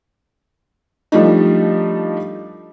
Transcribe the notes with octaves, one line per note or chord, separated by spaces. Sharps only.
F3 G3 A3 D4 D#4